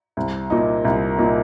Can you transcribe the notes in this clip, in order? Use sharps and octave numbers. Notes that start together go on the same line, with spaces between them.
C2
A#2 A#3 D#4
C2
A#2 A#3 D#4